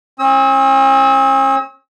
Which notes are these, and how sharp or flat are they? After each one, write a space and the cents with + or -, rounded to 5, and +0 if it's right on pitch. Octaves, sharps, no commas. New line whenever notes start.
C#4 -45 E6 -40